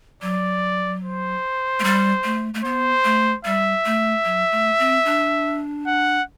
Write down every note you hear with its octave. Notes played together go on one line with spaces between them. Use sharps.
F#3 D5
C5
A3
G3
A3
A3
B3 C5
A3
G3 E5
A3
F#3
A3
C4
D4
F#5